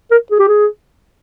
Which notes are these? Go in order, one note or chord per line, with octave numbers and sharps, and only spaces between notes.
A#4
G#4
G4
G#4